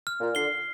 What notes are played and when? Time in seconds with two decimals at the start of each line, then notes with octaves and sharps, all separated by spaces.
0.07 F6
0.20 A#2
0.35 D3 C7 G7